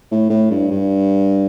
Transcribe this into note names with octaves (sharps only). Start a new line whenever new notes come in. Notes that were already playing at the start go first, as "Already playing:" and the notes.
A2
A2
G2
G2